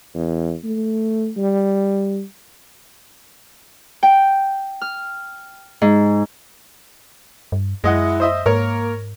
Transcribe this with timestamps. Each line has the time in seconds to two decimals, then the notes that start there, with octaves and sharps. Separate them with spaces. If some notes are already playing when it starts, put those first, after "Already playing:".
0.15 E2
0.64 A3
1.37 G3
4.03 G5
4.81 F6
5.82 G#2
7.52 G2
7.84 F#2 G#3 E4 D#5 F#5
8.20 C5 D#5 E5
8.46 G#2 A#3 A#4 C#5